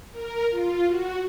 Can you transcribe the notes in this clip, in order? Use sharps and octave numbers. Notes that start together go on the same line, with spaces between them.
A#4
F4
F#4